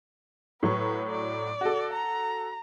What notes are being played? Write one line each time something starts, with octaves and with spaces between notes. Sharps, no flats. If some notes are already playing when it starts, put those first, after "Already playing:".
A2 F#3 B4 C#6
D5
F#4 A4
A#5